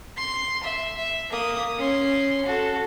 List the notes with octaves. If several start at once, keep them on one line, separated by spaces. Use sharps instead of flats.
C6
E5
E5
A#3 D#6
C#4 C6
F#4 A4